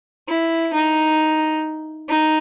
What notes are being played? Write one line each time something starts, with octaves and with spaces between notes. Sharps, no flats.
E4
D#4
D#4